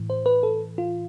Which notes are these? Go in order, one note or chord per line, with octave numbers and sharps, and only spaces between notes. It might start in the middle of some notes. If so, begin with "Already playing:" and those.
Already playing: A2 E3
C5
B4
A4
F4